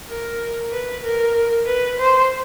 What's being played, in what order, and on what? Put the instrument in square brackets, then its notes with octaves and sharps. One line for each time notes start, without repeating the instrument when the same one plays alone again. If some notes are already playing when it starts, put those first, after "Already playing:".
[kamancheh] A#4
B4
A#4
B4
C5